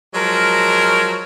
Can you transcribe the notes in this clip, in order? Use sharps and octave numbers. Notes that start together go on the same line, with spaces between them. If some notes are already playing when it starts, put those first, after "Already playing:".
F3 F#3 G#3 A#4